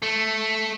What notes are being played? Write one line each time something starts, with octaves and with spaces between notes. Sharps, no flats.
A3